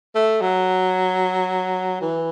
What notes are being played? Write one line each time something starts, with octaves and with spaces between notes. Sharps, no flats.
A3
F#3
E3